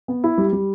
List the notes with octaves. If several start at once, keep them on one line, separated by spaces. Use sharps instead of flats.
B3
E4
G3
G3